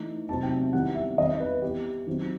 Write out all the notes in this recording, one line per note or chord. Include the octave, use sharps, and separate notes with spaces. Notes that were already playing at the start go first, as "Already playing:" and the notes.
Already playing: E3 A3 D#4
C3 F#3 A3 D#4 A5
G5
A5
D#3 G3 B3 E4 F#5
E5
D#3 G3 C4 D#5
B4
E3 B3 E4 G4
D#3 F#3 C4 D#4